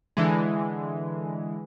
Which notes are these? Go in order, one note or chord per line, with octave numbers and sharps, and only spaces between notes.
D3 E3 G#3